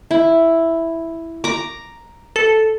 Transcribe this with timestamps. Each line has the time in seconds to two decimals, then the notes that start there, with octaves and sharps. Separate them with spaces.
0.11 E4
1.44 A#5 D6
2.36 A4